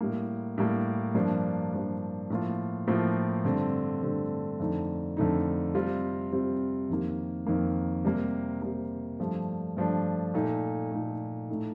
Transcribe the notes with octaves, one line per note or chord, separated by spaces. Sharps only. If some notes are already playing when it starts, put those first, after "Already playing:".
A2 G3 A#3
A2 G3 A#3
G2 F3 A#3 D4
G2 F3 A#3 D4
A2 F3 A#3 F4
A2 F3 A#3 F4
G2 D3 A3 C4
G2 D3 A3 C4
F2 D3 A3 D#4
F2 D3 A3 D#4
C3 G3 C4 F4
C3 G3 C4 F4
F2 D#3 A#3
F2 D#3 A#3
C3 G3 A#3
C3 G3 A#3
G2 F3 A3 D4
G2 F3 A3 D4
A#2 A3 D#4
A#2 A3 D#4
A2 A3 D#4